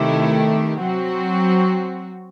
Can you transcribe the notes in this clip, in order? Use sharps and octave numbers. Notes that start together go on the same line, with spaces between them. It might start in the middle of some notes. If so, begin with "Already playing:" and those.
Already playing: C3 D#3 A3 E4 G4
F#3 C4 F#4